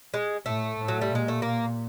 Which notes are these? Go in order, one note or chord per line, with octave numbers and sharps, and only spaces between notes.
G#3
A2 A3
A2
F#3
G3
A#2
G#3
A3
A#3